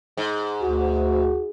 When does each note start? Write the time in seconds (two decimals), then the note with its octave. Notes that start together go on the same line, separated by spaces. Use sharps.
0.17 G#2
0.62 D2 F#4